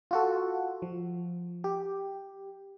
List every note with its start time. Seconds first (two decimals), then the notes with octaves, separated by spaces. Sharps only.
0.11 F4 F#4 A4
0.82 F3
1.64 G4